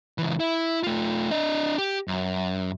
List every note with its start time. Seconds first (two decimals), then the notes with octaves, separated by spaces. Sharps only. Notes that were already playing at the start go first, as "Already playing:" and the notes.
0.18 C#2 E3
0.40 E4
0.83 A3 F4
1.31 D4 D#5
1.78 G4
2.08 F#2